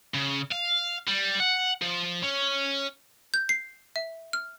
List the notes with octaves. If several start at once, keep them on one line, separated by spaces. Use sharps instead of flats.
C#3
F5
G3
F#5
F3
C#4
G6
C7
E5
F6